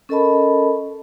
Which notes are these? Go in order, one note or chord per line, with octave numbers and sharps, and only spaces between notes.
C#4 A4 A#4 D#5 A5 B5